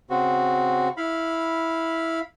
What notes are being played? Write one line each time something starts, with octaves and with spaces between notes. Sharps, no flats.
C#3 C4 F#4
E4 F5 B5